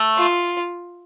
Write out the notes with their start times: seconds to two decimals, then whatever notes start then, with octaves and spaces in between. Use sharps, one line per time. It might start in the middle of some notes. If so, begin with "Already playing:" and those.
Already playing: A3
0.18 F4